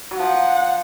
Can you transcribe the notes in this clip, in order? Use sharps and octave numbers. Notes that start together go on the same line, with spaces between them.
F#3
F3 F#5